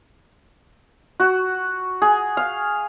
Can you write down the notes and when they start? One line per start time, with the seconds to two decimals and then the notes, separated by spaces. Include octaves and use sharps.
1.20 F#4
2.02 G#4
2.37 F5